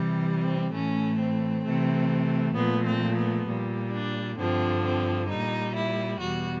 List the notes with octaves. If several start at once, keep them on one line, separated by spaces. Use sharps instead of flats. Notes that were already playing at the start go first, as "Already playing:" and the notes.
Already playing: C3 E3 G3
C4
A2 E3 A3 C#4
C4
C3 E3 A3
A#2 F3 A3 B3
C4
B3
A#2 G3
D4
G2 D3 F3 C4
C4
A#2 G3 D#4
E4
E2 B2 G3 F#4